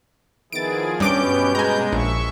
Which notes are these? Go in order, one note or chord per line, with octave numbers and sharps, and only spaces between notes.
D#3 F3 B3 E4 G#4 A6 D7
G2 B2 B3 C#4 G4 D6 G6 D7
G#3 G#5 A#5
A#1 E5 C#6